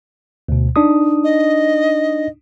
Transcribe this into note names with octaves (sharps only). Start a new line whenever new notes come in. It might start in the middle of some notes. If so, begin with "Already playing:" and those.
D2 B2
D4 D#4 D#6
D#5